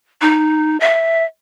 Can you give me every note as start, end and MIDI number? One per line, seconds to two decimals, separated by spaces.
0.22 0.79 63
0.80 1.24 76